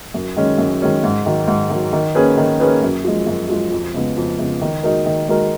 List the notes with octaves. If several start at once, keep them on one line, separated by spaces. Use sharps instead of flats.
F#2
D#3 G#3 C#4
F#2
D#3 G#3 C#4
G#2
D#3 F#3
G#2
D#3 F#3
D#3
A#3 C#4 G#4 B4
D#3
A#3 C#4 G#4 B4
F#2
F3 G#3
F#2
F3 G#3
F2
C#3 G#3 B3
F2
C#3 G#3 B3
D#3
G#3 D#4 F#4 A#4
D#3
G#3 D#4 F#4 A#4